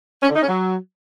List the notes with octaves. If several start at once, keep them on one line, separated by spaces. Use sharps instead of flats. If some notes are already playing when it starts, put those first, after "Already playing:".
C#4
D3
D#4
C#4
F#3